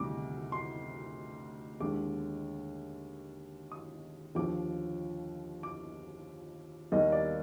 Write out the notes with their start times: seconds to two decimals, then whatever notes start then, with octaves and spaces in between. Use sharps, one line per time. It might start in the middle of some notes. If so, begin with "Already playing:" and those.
Already playing: D2 C3 D#3 G3 D6
0.52 C6
1.80 D#2 D3 G#3 D6
3.72 D#6
4.35 D#2 D3 F3 D6
5.63 D6
6.92 D#2 D#3 G3 A#3 D#5
7.12 D5